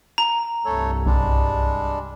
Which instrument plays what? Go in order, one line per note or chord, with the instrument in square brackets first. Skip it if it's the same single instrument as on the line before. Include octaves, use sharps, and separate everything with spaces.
[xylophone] A#5
[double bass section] C2 G2 [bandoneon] A3 A4 C#5
[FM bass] B1 [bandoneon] G3 G#3 D4